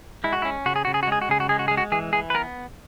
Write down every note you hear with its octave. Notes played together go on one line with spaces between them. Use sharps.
G#3 E4
F#4
E4
C#4
C#3 F#4
G#4
C#3 F#4
G#4
F#4
G#3 G#4
F#4
C#3 G#4
F#4
G#3 G#4
F#4
G#3 G#4
F#4
E3 G#4
E3 G#4
B4
B3 A#4